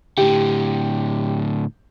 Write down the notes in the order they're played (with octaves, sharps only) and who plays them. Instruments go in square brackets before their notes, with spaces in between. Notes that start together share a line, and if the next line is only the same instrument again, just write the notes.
[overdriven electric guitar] A2 D3 [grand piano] G4